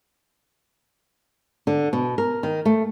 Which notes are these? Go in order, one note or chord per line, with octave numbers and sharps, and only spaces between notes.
D3
B2
A#4
D#3
A3